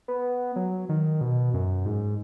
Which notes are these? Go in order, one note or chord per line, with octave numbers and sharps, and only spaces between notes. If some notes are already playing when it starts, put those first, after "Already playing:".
B3
F#3
D#3
B2
F#2
G#2